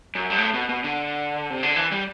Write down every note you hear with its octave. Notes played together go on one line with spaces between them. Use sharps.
F#2
G2
A2
B2
B2
D3
C3
D3
E3
G3